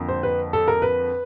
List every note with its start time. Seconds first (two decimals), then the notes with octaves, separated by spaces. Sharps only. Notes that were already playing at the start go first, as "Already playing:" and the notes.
Already playing: F2 D3 F3 A#3
0.09 C5
0.23 B4
0.53 A4
0.68 A#4
0.82 B4